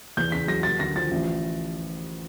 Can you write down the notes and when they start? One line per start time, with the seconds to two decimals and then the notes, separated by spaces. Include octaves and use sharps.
0.17 E2 G6
0.32 C#3 B6
0.48 F#3 A#6
0.63 D#2 A6
0.79 D3 A#6
0.95 F3 A6
1.11 A1